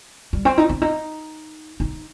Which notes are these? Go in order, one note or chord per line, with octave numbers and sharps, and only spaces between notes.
G3
C4
D#4
C4
D#4
D#4